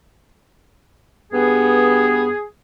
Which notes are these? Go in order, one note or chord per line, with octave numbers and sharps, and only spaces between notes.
G2 B3 G#4